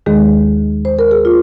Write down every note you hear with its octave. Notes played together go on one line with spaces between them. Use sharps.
D#2 D#3 G#3 G#4
C5
A#4
G#4
F4